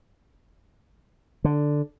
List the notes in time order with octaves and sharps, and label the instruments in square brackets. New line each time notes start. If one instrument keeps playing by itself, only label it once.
[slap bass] D3